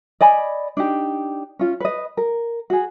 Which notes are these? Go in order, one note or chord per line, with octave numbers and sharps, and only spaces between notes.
D5 D#5 G#5 B5
D4 D#4 G4
C#4 F4
B4 D#5
A#4
F#4 G#4